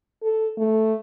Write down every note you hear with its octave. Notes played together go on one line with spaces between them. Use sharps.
A4
A3